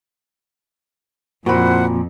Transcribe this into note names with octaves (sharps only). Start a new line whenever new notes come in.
F2 A#2 E4 F#4 C5 F#5 B5